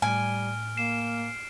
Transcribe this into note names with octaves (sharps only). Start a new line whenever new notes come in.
A2 G3 G#5 F6 D7
A#3 C7 E7